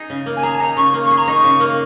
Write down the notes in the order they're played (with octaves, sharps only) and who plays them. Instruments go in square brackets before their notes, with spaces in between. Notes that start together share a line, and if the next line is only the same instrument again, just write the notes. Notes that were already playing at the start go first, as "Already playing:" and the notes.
Already playing: [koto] D#4 G#4
C#3
A#3
[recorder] G#5
[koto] G#4 [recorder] A#5
[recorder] G#5
[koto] D#4 [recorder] A#5
[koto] C#3 [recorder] C#6
[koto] A#3
[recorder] C#6
[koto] G#4
[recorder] A#5
[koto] D#4 [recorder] C#6
[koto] C#3
A#3